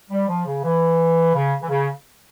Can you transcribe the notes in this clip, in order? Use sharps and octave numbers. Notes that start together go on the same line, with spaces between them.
G3
F3
C#3
E3
C#3
E3
C#3